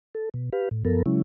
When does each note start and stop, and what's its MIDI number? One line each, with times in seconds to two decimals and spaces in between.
0.15 0.29 69
0.34 0.50 47
0.53 0.69 67
0.53 0.69 71
0.53 0.69 77
0.71 0.83 45
0.85 1.02 42
0.85 1.02 53
0.85 1.02 59
0.85 1.02 69
0.85 1.02 70
1.06 1.22 49
1.06 1.22 54
1.06 1.22 56
1.06 1.22 61
1.06 1.22 64